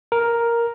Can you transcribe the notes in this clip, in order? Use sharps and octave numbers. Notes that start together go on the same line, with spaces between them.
A#4